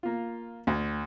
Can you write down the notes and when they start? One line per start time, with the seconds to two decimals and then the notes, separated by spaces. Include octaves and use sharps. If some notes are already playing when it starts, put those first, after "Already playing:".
0.03 A#3 F4
0.67 D2